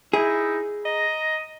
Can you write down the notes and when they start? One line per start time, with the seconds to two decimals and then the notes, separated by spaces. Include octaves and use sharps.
0.13 D#4 E4 G#4
0.85 D#5 A#5